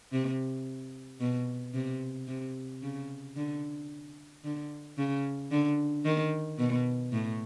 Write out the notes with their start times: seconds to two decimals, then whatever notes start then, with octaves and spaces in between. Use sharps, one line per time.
0.12 C3
1.20 B2
1.74 C3
2.28 C3
2.82 C#3
3.36 D3
4.44 D3
4.98 C#3
5.51 D3
6.05 D#3
6.58 B2
7.13 A2